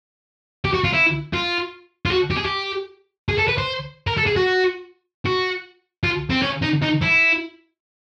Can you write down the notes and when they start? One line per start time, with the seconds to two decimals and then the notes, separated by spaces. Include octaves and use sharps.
0.65 G4
0.74 F#4
0.84 F4
0.93 E4
1.33 F4
2.06 F4
2.11 F#4
2.31 G4
2.37 G#4
2.45 G4
3.29 G#4
3.38 A4
3.48 B4
3.58 C5
4.07 A#4
4.17 A4
4.27 G#4
4.36 F#4
5.25 F#4
6.04 F4
6.30 C4
6.42 C#4
6.62 D#4
6.82 D#4
7.02 E4